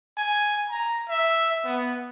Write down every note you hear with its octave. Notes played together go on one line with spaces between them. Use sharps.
G#5
A#5
E5
B3